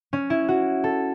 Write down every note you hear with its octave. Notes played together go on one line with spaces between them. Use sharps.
C#4
E4
F#4
A4